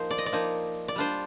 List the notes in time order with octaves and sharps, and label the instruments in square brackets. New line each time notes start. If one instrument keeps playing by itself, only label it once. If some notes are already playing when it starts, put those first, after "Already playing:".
Already playing: [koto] F3 A#3 D#4 C5
D5
D#5
D5
F3 A#3 D#4
D5
G3 D4 F4 C5